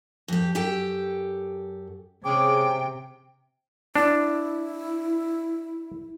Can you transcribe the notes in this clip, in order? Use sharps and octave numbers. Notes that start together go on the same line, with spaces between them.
F2 G4
F#2 G4 A4 G5
C3 G#3 C#4 G#4 G5 D6
D4 E4